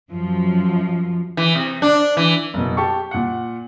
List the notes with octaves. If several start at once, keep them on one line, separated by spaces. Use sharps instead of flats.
F#2 F3
E3
C3
D4
E3
F#1 B2
G4 A5 C#6
A#2 F#5